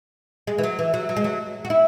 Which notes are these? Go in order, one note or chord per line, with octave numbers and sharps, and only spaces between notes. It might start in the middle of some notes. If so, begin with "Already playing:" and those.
G#3
E3
F#3
E3
F#3
F#3
G#3
F#3
F#4
E4